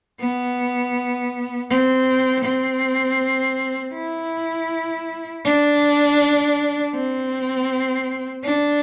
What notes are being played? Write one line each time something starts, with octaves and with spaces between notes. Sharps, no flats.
B3
C4
C4
E4
D4
C4
D4